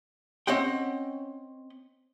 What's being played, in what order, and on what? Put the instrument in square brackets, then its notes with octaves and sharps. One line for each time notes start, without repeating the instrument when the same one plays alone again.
[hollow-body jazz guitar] C4 C#4 D#5 F#5 G5